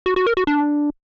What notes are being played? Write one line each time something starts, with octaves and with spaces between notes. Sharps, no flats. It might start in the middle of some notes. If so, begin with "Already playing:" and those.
F#4
F#4
A#4
F#4
D4